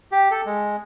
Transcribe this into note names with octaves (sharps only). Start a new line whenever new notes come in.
G4
A4
G#3